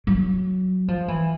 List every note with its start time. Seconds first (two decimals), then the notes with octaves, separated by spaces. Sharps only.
0.07 F#3
0.88 F3
1.08 E3